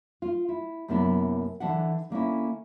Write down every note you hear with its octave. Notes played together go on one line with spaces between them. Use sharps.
F4
E4
F#2 C3 A#3 B3 D4 E4
D3 E3 D4 E5 F#5
D3 A#3 C#4 E4